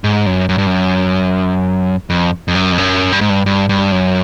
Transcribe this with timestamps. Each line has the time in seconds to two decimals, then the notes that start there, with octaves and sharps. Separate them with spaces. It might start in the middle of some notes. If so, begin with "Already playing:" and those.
0.04 G#2
0.26 F#2
0.49 F#2
0.58 G2
0.67 F#2
2.10 F2
2.48 F2
2.55 F#2
2.72 F2
2.78 F#2
3.12 G2
3.21 G#2
3.30 G2
3.46 G2
3.69 G2
3.92 F#2